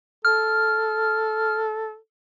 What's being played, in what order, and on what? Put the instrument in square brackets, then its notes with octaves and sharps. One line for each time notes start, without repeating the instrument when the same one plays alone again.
[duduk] A4 [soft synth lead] F6